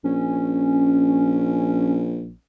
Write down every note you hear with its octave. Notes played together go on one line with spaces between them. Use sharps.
A#1 C#4